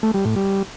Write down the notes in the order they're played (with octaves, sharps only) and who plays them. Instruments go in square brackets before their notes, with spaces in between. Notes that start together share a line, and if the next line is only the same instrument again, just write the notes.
[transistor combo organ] A3
G3
A2
G3